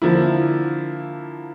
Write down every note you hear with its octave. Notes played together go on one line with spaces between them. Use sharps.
D3 F3 A#3 E4